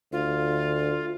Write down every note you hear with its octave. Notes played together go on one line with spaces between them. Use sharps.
D2 F4